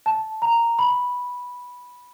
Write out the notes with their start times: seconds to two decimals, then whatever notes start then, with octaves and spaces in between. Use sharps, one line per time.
0.06 A5
0.42 A#5
0.79 B5